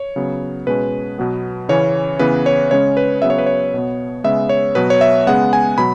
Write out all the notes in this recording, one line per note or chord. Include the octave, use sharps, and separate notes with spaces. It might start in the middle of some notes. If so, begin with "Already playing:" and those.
Already playing: C#5
C#3 F#3 B3
B2 G#3 C#4 B4
B2 F#3 B3
C#3 E3 C#4 C#5
C#3 E3 B3 B4
C#5
C#3 G#3 C#4 C#5
B4
C#3 F#3 B3 E5
C#5
B4
C#5
B2 B3
C#3 G#3 B3 E5
C#5
B2 F#3 B3 B4
C#5
E5
C#3 G#3 B3 F#5
G#5
B2 F#3 B5